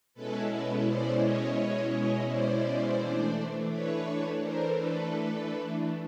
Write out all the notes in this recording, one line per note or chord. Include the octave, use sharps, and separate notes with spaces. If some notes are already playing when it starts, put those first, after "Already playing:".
B2 G#3 C#4 E4 A4 B4
A4 B4
C5 D5
C#5 D#5
C#5 D#5
C#5 D#5
C5 D5
E3 A3 D4
B4 C#5
A#4 C5
A4 B4